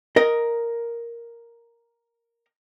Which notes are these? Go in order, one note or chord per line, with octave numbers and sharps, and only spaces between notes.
A#4 D#5